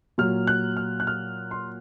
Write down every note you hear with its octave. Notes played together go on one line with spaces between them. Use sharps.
A#2 F#3 F6
F#6
F6
F#6
F6
C6